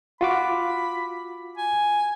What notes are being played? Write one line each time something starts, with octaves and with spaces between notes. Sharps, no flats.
F4 F#4 B5 D6
G#5